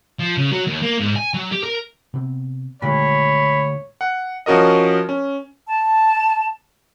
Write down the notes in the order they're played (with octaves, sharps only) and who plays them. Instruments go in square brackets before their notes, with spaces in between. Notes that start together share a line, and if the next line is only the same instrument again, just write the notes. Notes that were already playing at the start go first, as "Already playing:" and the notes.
[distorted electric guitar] F3
C#3
F#3
D#2
A#3
G#2
G#5
F#3
G4
A#4
[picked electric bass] C3 B3 C4
[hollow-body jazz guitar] D2 [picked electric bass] A#2 D#3 G#3 [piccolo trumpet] C#5 [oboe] B5
[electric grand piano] F#5
F3 C#4 F#4 A#4 D#5
C#4
[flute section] A5